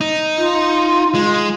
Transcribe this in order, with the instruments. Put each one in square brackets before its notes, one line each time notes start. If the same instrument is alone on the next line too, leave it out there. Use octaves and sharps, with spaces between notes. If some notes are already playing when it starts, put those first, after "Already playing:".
[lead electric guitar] D#4
[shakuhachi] F4
[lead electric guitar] G#3